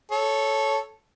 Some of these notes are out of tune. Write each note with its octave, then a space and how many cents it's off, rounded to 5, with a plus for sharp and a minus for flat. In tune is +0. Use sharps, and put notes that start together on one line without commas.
A4 -10 C#5 +0